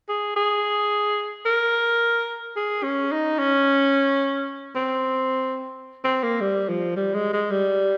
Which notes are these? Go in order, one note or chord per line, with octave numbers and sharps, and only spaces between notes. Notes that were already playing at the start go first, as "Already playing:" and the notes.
G#4
G#4
A#4
G#4
C#4
D#4
C#4
C4
C4
A#3
G3
F3
G3
G#3
G#3
G3